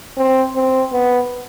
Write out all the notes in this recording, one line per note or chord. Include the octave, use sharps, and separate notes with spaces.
C4
C4
B3